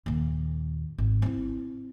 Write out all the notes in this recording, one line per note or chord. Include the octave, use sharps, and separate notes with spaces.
D#2 A#2
G#1
C4 E4